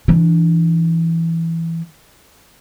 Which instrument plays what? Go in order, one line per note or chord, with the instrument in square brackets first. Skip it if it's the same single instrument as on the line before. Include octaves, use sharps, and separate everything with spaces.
[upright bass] E3 D4